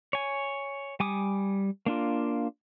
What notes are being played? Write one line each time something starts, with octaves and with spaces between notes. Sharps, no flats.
C#5 G#5
G3 G#5 D6 D#6
A#3 D4 F4